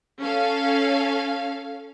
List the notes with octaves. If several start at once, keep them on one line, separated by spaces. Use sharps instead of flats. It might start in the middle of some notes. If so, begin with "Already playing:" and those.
C#4 A4 F5